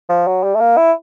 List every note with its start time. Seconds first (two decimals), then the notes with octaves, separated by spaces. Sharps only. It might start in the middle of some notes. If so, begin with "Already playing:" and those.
0.09 F3
0.27 F#3
0.44 G3
0.55 A3
0.60 A#3
0.77 E4